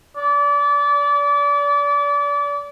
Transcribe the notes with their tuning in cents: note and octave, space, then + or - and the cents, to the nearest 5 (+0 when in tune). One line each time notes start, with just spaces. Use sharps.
D5 -30